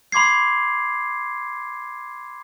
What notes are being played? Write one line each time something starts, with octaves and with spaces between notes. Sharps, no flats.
B5 C6 D6 G#6 C7